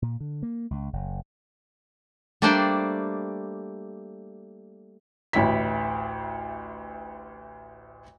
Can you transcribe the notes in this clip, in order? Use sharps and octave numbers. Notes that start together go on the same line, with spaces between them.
A#2
D3
A#3
C#2
F#1
G3 A3 A#3 D4 C5 D5
A1 D2 E4 B6